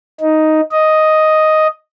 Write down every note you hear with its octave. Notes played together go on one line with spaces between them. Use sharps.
D#4
D#5